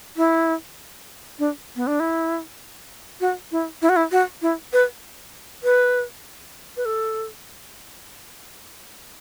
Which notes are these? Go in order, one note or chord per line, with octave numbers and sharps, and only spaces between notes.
E4
D4
B3
D4
E4
F#4
E4
E4
F#4
E4
F#4
E4
B4
B4
B4
A4